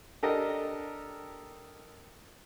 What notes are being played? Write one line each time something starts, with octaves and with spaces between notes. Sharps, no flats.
D4 G4 A4 A#4 D#5